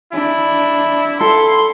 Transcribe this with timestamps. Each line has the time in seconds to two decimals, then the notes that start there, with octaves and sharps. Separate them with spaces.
0.13 D4 E4
1.21 E4 A4 C6